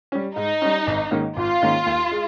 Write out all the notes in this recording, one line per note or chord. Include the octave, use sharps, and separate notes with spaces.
G3 C#4
G#2 D#4
G3 C#4
G#1
G#2 D#3 A#3 C#4
G#1 F4
G#2 D#3 A#3 C#4
D#2
G#3